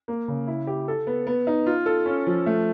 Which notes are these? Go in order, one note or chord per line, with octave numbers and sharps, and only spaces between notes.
A#3
C#3
E4
G4
A4
B3
B3
D#4
F4
A4
C#4
F3
A3